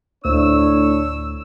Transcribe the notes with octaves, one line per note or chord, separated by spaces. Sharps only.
D2 A2 D4 C#5 E6